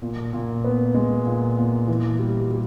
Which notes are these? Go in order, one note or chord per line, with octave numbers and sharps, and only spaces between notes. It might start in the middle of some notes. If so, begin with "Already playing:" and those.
A#2
A#2
B3
G#3
A#2
A#2
E3
G3
G3